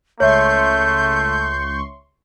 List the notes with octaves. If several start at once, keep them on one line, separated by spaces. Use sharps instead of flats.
C#2 A3 C#5 E5 C6 C#6 G6